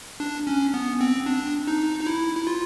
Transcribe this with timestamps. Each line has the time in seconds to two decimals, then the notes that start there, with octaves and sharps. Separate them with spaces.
0.20 D4
0.47 C#4
0.74 B3
1.01 C4
1.26 D4
1.67 D#4
2.01 D#4
2.07 E4
2.36 E4
2.47 F4